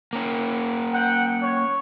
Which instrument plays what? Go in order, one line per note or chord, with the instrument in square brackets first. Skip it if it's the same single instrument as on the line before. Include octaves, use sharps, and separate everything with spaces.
[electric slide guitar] A#3 C#4
[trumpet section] F#5 G5
C#5